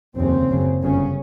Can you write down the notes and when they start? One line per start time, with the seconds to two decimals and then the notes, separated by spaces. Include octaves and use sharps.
0.15 F1 D#2 C#3 C4
0.49 F#1 F#2 C#3
0.83 G1 F#2 C#3 C#4